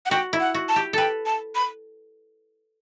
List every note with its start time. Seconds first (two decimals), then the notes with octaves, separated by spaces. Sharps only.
0.06 F#5
0.11 F#4 G5
0.33 E4
0.40 F#5
0.54 F#4
0.69 A5
0.76 G4
0.93 A4 B4 G5
1.26 A5
1.55 B5